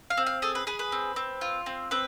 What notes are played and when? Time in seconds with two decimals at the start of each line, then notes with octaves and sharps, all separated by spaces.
0.10 F5
0.17 C4
0.26 F5
0.42 G#4 A4
0.55 B4
0.67 G#4 B4
0.79 B4
0.92 C4
1.16 C4
1.41 F4
1.66 C4
1.91 C4 B4